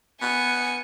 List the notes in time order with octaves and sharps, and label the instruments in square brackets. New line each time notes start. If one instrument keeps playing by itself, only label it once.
[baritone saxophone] B3 [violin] G#5 C#7